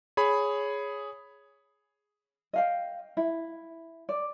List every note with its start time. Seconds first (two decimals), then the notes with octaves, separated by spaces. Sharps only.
0.17 G#4 C#5 B5
2.53 D#5 F5 G5
3.17 E4
4.09 D5